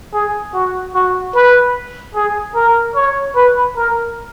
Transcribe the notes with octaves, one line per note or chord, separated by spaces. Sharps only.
G#4
F#4
F#4
B4
G#4
A#4
C#5
B4
A#4